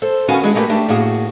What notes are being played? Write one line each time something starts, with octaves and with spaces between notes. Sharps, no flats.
A4 C5
D#3 B3 C#4 F#4 F5 G#5
E3 G#3 D4 E4 F#4 G#4
A3 A#3 D#4 F#4 G4 B4
A3 D4 G4 A5
A2 A#3 F#4 G#4